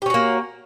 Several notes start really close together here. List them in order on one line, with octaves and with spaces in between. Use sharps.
G4 C#4 F#4 A#3